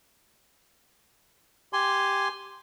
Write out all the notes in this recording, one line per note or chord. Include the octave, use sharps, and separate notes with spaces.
G4 G#5 C6